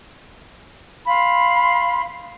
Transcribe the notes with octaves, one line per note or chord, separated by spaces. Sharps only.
F5 B5 C6